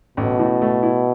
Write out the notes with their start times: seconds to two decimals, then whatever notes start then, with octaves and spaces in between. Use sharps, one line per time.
0.17 A1 B2
0.39 A2
0.62 A3
0.83 E4